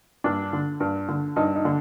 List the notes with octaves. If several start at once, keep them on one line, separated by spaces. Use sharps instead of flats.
G2 D4
D3
G2
D3
G2 D#4
D#4
D3